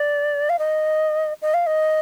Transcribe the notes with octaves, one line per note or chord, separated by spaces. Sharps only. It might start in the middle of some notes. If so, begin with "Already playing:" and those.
Already playing: D5
F5
D#5
D#5
F5
D#5